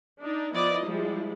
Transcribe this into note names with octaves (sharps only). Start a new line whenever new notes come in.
D4 D#4
F3 B3 E4 D5 D#5
F3 G3 G#3 E4